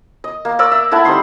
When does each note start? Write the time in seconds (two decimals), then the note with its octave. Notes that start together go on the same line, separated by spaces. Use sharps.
0.24 D#5
0.45 A#3
0.59 A#4 D5 C#6 E6
0.72 E5
0.92 A3 E4 F#5 A5
1.05 G3 C4 D#4 C6